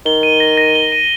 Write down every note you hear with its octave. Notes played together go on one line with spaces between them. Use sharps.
D#3 G7
D#7
A#6
A#6
G7
D#7